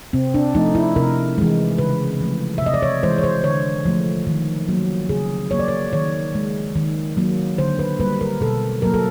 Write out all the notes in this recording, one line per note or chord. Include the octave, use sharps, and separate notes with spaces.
C3 C4
D4
F3 A3 D#4
E4
C3 A#4
E3 G#3
C#3 B4
F3 A3
E5
C3 D#5
D5
C#5
E3 G#3 C5
C#5
C5
D3 C#5
F3 A3
D#3
F#3 A#3
C#3 G#4
F#3 A#3 C#5
D5
C#5
D#3 C#5
G#3
D#3
F#3 A#3
D3 C5
B4
G3 A#3 B4
A#4
B2 A4
F#3 A#3 A#4
A4